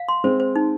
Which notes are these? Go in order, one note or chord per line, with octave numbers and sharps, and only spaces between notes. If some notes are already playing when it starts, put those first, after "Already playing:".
Already playing: F5
C6
G#3 C4 C5
C5
D#4